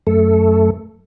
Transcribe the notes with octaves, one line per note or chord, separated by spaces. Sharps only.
F#2 A3 A4